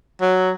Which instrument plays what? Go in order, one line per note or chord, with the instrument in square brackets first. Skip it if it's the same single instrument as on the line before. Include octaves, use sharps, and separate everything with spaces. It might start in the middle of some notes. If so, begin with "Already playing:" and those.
[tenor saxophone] F#3